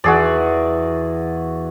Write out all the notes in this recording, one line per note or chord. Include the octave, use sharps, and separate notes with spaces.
E2 F#4 G#4 D5